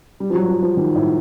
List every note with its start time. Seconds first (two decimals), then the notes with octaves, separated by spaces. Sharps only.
0.20 G3
0.30 F3
0.35 F#3
0.48 F3
0.62 F3
0.77 D#3
0.96 A2